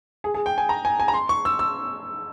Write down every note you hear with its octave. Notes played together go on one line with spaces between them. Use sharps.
G#4
G#4
G5
G#5
A#5
G#5
G#5
A#5
C6
C#6
E6
E6